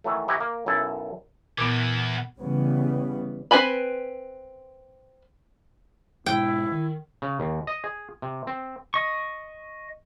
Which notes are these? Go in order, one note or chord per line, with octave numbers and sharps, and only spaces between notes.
D#3 E3 F#3 A3
E3 D#4 E4 F#4 G4
A#3
B1 F#2 E4 A4
E2 A#2 E3 B3
C#3 E3 G3 B3
C4 F#4 B4 G#5 B5
G#2 B2 G#3 E4 G5
D#3
C#3
D#2
D#5
G#4
C3
C4
D#5 C#6